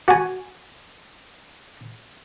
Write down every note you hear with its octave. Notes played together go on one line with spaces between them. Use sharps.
F#4 G#5